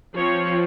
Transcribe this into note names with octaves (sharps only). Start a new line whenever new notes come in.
F3 C4 C#5